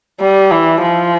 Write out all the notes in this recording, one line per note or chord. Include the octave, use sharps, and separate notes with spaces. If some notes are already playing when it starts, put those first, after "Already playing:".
G3
E3
F3